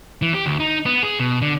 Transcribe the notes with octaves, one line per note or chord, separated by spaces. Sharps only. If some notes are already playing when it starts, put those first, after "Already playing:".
E3
G4
D2
D#4
B3
G#4
B2
D3